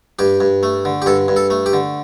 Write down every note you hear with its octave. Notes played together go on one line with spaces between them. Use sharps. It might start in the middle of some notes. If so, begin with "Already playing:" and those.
G2 G4
G2
A3
D3
G4
G2 A4
G2
A4
A3
G4
D3